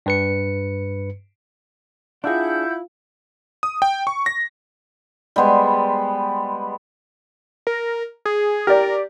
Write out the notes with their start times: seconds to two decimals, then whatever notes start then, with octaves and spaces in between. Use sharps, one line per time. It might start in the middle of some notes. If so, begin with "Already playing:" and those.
0.06 G2 B4 C#7
2.24 D4 E4 F4 G#4 F5 F#5 G6
3.63 D#6
3.82 G5
4.07 C#6
4.26 A#6
5.36 G3 G#3 B3 C5
7.67 A#4
8.25 G#4
8.67 G4 A#4 D5